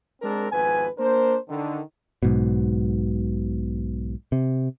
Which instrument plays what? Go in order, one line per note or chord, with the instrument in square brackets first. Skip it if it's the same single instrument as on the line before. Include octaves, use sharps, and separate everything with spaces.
[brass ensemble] G#3 C4 D4 A#4
G#1 F2 B3 B4 G#5
A#3 D4 A#4 C5
D3 D#3
[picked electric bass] B1 G#2 B2
C3